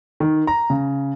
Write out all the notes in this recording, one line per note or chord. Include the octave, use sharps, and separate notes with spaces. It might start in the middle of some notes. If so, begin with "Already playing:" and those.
D#3
A#5
C#3